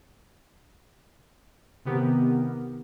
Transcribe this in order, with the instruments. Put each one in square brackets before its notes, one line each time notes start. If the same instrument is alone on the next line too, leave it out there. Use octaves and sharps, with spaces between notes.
[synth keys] C3 D#3 B3 G4 A#4